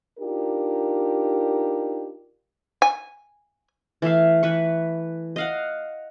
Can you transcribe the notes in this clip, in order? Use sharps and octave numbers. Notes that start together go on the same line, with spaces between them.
D4 D#4 F4 G4 A#4
G#5
E3 A3 E5 F5
E3 B4 C#6
D#5 F5 F#5